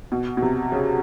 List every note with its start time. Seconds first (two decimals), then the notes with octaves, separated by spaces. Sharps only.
0.12 B2
0.37 B2
0.42 C3
0.72 C#3